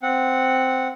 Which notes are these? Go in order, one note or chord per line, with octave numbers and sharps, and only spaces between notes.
C4 F#5